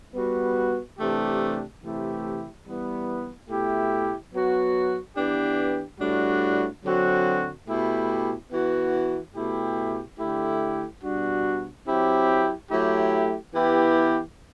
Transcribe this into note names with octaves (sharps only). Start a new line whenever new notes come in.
G3 B3 F#4
C3 E3 A3 D4 G4
C3 E3 A3 E4 G4
E3 G3 B3
B2 A3 E4 G4
F#3 B3 F#4
E3 B3 D4 G4
A2 G3 D4 F#4
D3 F#3 C4 F#4
B2 A3 E4 G4
E3 B3 F#4
B2 A3 E4 G4
D3 A3 E4 G4
B2 G3 D4 F#4
F#3 C4 E4 G4
F#3 A3 E4 G4
E3 B3 E4 G4